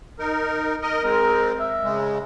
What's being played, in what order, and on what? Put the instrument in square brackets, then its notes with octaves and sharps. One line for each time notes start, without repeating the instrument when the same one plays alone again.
[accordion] D#4 A#4
A#4 D#5
[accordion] G#3 C4 [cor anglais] A#4
[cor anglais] E5
[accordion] C#3 G#3